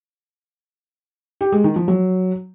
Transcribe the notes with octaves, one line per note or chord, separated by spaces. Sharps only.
G4
G#3
D#3
F3
F#3